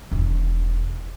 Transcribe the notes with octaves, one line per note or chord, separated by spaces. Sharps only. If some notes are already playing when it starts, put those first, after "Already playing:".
E1 D#3